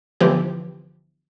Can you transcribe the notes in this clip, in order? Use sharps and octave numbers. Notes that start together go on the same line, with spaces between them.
G1 E3 F3 G4